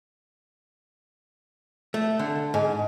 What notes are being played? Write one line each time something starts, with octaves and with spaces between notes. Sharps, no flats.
A3
D3
G#2